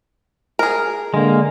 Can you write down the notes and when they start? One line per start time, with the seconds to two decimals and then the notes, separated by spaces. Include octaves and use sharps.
0.59 G#4 A#4
1.14 D3 G#3 A#3